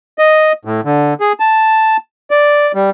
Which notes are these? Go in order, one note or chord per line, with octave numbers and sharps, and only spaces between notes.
D#5
A2
D3
G#4
A5
D5
G3